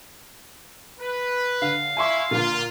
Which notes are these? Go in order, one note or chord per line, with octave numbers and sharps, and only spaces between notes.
B4
D3 F5
E4 G#5 C6 C#6
A#2 D3 A#3 F4